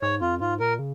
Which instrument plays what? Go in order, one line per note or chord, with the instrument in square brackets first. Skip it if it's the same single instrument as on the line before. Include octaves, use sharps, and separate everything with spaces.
[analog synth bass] G#2 [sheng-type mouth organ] C#5
[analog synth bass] F2 [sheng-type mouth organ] F4
[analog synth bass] G#2 [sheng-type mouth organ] F4
[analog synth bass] A#2 [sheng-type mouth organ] A#4
[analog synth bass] C#3